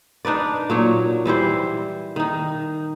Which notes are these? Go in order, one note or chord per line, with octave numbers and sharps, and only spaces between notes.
D4 D#4 B4 D5
A#2 F#3 C#5
E3 G3 E4 C5
D#3 D#4